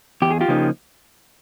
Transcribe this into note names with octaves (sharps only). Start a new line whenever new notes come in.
E2 G4
G#4
F4 G4
C#3 F3 A#3 D#4